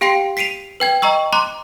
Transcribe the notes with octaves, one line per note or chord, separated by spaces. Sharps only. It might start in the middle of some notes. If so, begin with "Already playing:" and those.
G4 F5 G5 C6 C7 C#7
B6 C7 D7 D#7 F7
B4 G5 G#6
D#5 G5 A#5 C#6 E6
A#5 C6 D6 F#6